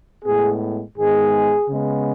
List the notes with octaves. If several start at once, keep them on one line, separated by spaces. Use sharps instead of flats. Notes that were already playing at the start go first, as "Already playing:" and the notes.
A2 G#3 B3 G#4
G#2 D#3 G#3 B3 G#4
C#3 G#3 B3